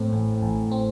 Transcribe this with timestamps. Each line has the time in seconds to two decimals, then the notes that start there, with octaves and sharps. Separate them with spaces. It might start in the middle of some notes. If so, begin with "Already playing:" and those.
Already playing: A2 C4
0.13 A1
0.42 A1
0.71 C4